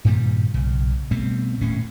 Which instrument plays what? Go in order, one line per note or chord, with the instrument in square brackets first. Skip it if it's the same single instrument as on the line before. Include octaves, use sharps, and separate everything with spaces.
[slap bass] G2 A#2 D#3 G3
B1 C#3
B2 G3 A3 C4
D#1 A2 C#4